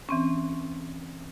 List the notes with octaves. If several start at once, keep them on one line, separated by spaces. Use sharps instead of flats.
E3 C4 C#4